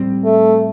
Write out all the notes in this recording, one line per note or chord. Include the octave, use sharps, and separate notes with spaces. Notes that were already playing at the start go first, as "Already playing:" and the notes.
Already playing: A2 G3 C4
A3